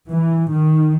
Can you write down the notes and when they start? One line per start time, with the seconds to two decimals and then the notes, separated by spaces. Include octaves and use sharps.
0.10 E3
0.51 D#3